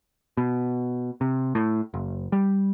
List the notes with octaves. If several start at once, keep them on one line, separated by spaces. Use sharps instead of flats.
B2
C3
A2
F#1
G3